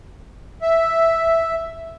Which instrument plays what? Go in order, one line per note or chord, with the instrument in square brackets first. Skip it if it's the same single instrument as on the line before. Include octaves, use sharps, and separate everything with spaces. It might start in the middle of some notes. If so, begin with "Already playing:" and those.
[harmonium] E5